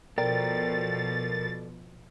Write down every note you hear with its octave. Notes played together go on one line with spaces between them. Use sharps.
B2 F3 A4 A#4 D5 G5 A6